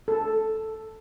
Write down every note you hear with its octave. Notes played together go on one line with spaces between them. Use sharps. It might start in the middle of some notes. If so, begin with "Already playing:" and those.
A4